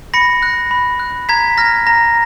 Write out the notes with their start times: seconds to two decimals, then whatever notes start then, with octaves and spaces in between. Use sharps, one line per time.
0.14 B5 A#6 C#7
0.43 F#6
0.71 B5
0.99 F#6
1.29 A#5 G#6 B6
1.58 F6 A#6
1.87 A#5 A#6